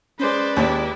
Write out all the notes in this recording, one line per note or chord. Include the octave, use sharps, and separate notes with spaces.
G#3 C#4 B4 C5 D5
D#2 G#3 E4